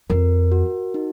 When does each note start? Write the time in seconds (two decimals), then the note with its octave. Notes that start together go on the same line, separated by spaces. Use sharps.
0.10 F2 A#4
0.52 F#4
0.94 D#4